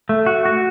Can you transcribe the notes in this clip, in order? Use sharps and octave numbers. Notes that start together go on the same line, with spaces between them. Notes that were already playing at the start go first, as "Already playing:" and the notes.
A3
F#4
F#4